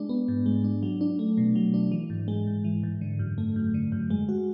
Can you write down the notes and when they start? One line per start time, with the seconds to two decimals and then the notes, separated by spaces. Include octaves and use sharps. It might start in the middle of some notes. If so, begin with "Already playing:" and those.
Already playing: G#3 D4
0.09 B3
0.28 G#2
0.46 G#3
0.64 D4
0.83 F#3
1.01 D4
1.19 A3
1.38 B2
1.56 F#3
1.74 D4
1.92 E3
2.10 G#2
2.28 G#3
2.47 G#2
2.64 E3
2.83 G#2
3.01 D3
3.19 F#2
3.38 A3
3.56 F#2
3.74 D3
3.92 F#2
4.10 G#3
4.29 F#4